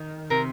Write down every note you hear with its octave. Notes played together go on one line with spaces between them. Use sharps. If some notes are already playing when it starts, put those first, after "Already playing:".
Already playing: D#3
C3 A#4